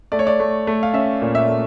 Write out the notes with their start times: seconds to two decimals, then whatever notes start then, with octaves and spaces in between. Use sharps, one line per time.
0.12 A3 D5
0.19 C#5
0.27 D5
0.40 A3
0.67 A3
0.83 F5
0.94 C#4 E5
1.22 A#2
1.35 E5
1.49 A3